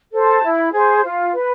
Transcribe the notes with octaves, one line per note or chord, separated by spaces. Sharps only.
A4 C5
A5
E4
G#4 C5
F4
B4